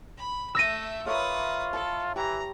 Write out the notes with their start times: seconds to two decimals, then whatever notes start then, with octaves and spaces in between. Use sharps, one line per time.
0.17 B5
0.55 A3 E5 E6 A#6 D#7
1.06 F4 A#4 B4 C#5 E5 D#6
1.73 A4 A5 B5
2.16 E3 G4 A#5